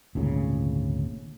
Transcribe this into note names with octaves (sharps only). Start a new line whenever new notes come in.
G#1 D2 A#2 C#3